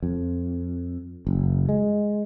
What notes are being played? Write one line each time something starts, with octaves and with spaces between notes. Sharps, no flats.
F2
F#1
G#3